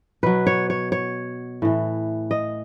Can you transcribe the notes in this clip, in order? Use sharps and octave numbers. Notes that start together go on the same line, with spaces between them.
B2 F#3 B4
C#5
C#5
C#5
A2 E3
D#5